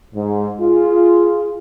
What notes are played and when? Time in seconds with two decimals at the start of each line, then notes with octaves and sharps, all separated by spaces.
0.14 G#2
0.60 F4 G#4